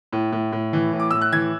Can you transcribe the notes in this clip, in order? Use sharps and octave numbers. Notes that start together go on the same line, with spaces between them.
A2
A2
A2
E3
A2
D6
A2 E6
F#6
E3 G#6